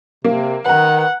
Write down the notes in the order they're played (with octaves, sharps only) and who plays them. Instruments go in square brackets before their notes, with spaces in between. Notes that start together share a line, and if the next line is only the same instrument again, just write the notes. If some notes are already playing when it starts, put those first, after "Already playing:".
[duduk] C3 [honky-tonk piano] A#3
[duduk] D#3 [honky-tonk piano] B4 A#5 [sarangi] F#5